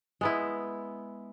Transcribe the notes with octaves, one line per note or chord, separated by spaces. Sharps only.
G#3 B3 E4